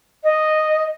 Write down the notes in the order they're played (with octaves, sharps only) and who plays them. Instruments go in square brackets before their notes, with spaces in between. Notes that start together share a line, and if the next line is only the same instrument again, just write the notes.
[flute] D#5